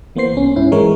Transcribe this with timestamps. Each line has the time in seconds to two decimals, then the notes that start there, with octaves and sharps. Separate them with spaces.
0.16 E3 A#3 B3 C5 C7
0.33 C2 C#4
0.56 G#2 C#4 E4
0.72 E3 G#3 A#4 C#5